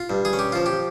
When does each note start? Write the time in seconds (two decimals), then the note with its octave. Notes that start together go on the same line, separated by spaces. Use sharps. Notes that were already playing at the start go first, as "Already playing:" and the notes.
Already playing: F4
0.10 G2
0.25 G#4
0.33 C#4
0.39 G4
0.52 F3 F4
0.66 G4